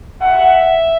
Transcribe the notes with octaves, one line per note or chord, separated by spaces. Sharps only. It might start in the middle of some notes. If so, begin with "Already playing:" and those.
E5 F#5